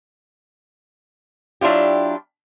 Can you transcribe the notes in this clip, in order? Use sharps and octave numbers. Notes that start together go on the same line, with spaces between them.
F#3 D4 E4 F4 G4